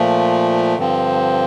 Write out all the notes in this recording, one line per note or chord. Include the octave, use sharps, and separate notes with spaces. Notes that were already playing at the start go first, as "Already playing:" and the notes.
Already playing: A#2 F3 A3
G2 D3 F3 C4